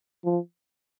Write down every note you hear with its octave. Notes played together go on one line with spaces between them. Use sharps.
F3